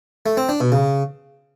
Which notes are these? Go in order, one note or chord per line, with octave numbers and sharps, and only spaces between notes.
A3
C4
D4
B2
C#3